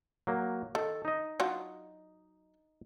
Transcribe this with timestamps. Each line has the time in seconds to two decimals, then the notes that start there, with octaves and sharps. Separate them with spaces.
0.27 F#3 A#3
0.75 D#3 A4
1.05 D#4 D#5
1.40 F#3 D4 F4